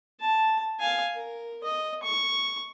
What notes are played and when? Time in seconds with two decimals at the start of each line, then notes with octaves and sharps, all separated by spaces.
0.20 A5
0.79 F5 G#5
1.14 A#4
1.64 D#5
2.03 C#6